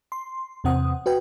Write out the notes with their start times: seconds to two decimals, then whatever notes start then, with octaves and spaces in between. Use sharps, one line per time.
0.12 C6
0.64 E2 C3 C4 F#5 D#6
1.06 F#4 B4 G5